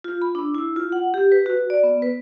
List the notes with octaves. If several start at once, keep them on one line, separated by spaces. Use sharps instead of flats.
F4
B5
D4
E4
F4
F#5
G4
B4
F#4
D5
B3
B4